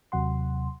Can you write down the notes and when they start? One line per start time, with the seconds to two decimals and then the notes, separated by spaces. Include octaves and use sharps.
0.12 D#2 C3 F#3 F#5 C6